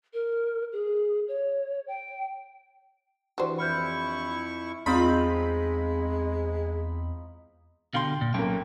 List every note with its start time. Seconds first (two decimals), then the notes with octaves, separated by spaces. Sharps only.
0.13 A#4
0.72 G#4
1.28 C#5
1.88 G5
3.38 E3 D4 F#4 G4 C5
3.58 F2 E4 B5 C#6 F6 G6
4.86 E2 G#3 C4 D#4 F4 B5
7.94 B2 D3 F5 G5 C6
8.21 A#2
8.34 B1 F#3 A#3 C#4 G5